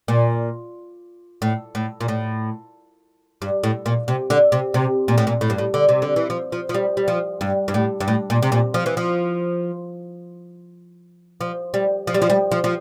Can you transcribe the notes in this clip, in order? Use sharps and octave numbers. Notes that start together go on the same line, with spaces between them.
A#2
A2
A2
A#2
A2
G2
A2
A#2
C3
D3
C3
C3
A#2
A2
A#2
A2
G2
A2
D3
C3
D3
E3
F3
F3
F3
G3
G3
F3
G2
G2
A2
G2
A2
A#2
C3
A#2
F3
E3
F3
F3
G3
F3
G3
F3
G3
F3
F3